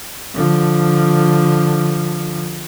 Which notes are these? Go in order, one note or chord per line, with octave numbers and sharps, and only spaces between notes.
D3 F3